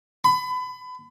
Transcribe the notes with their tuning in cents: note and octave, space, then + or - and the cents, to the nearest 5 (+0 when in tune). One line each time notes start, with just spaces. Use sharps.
B5 +30